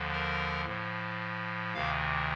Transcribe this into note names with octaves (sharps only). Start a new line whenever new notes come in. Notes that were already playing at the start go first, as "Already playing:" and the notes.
Already playing: D#2 D3 F3
A#4
A2 F3
D2 C3 D#3 F5